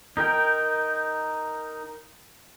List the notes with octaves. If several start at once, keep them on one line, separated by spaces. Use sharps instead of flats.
D#4 A#4 G5